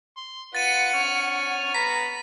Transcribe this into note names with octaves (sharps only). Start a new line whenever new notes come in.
C6
F4 B4 F#5 A6 C#7 D#7
C#5 F6
B3 A#5 B5 B6